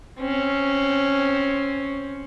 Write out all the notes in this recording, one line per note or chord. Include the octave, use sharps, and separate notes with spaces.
C4 C#4